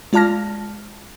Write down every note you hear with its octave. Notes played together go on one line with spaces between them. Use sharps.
G#3 F4 D5 A5 F6 A#6